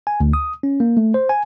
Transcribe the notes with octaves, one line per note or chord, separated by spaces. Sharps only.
G#5
D2
D#6
C#4
A#3
A3
C5
G#5